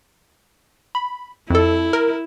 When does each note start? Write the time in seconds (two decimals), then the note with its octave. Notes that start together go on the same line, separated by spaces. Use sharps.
0.95 B5
1.50 F2 E4 A4
1.93 A#4